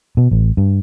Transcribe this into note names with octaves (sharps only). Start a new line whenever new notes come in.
B2
A1
G2